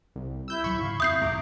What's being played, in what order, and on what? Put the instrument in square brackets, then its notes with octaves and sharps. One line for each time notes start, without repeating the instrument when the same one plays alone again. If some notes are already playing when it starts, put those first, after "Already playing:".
[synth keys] C2
[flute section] E4 [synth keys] E6 G6
[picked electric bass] D1 F#3 [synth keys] B5 C#6 G#6
[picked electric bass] G#2 C#3 [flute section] F5
[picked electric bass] F2 C4 [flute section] E5 [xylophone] D#6 G6 C7
[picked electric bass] E1 G#2 [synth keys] C2 A#5 D6